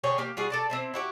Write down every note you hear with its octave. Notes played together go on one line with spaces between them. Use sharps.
D3 G#4 C#5 G5
A#3 G4
G3 F4 F#4 G#4
A4 D5 A5
C4 E4 C5
E4 F#4 G4